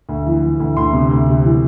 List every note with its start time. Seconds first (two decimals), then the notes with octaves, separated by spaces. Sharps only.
0.09 D2
0.26 E3
0.43 E3
0.60 D2
0.77 D2 C6
0.93 C3
1.11 D2
1.28 C3
1.44 E3